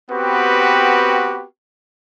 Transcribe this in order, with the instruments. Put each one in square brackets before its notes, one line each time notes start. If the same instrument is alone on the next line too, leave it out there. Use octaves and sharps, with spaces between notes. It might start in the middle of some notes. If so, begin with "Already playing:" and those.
[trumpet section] B3 C4 F#4 G4 B4